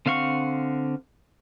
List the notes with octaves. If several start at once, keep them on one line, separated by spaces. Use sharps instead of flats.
D3 C4 F5 F#5 C#6